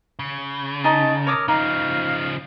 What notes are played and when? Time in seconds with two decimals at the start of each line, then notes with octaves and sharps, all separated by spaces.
0.19 C#3
0.84 D#4 D#5 G#5 A5
1.27 A#4 C#5 D6 D#6
1.48 C#3 F3 D#4 F5